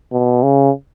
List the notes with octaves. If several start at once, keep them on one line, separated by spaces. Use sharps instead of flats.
B2
C#3